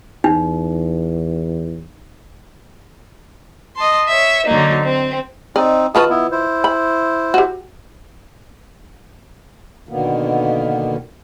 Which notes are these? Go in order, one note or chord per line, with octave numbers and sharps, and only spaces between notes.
E2 D#4
D#5 A5 C6
C#5 E5
D3 F#3 A#3 D#4
C4
C4 D#4 D5 D#5
D#3 F4 F#4 B4 A5 D#6
B3 E4
E4 C5
B5
F#4 G4
B2 D3 D#3 A#3 B3